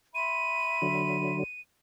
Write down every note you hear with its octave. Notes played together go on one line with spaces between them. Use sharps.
E5 B5 C6 D#7
D3 F#3